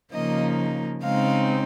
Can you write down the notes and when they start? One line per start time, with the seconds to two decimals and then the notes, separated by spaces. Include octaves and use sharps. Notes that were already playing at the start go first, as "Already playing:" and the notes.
0.13 C#3 F3 A#3 D#4 D#5
1.03 C#3 G#3 C4 D#4 F5